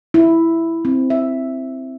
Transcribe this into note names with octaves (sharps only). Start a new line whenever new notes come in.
E4
C4
E5